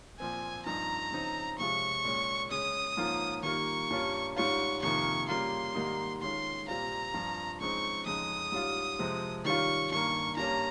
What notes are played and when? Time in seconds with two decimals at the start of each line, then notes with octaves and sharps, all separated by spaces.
0.19 A#2 F3 C4 G#5
0.66 G2 F3 C4 D#4 A#5
1.12 C#3 F3 C4 D#4
1.58 C3 F3 G#3 C#4 F4 C#6
2.04 A#2 G#3 C#4
2.51 C#3 G#3 C#4 D#6
2.97 G#2 F3 A#3 C#4 F4
3.43 D#3 G3 A#3 F4 C#6
3.90 G2 G3 A#3 C#4 F4
4.36 G#2 G3 C#4 F4 C#6
4.82 F2 C3 D#3 A#3 F4 C#6
5.28 C#3 G3 A#3 F4 C6
5.75 G#2 D#3 G3 A#3 D#4
6.21 D#3 G#3 C#4 F4 C6
6.68 A#2 G3 C4 F4 A#5
7.14 G2 F3 C4 F4
7.60 C#3 F3 G#3 C4 D#4 C#6
8.06 F2 C#3 G#3 D#4 D#6
8.52 G#2 G3 C#4 F4
8.99 F2 C3 F3 G#3 C4
9.45 D#3 G3 C#4 F4 C#6
9.91 G2 D#3 A#3 C#6
10.37 G2 G3 A#3 C#4 A#5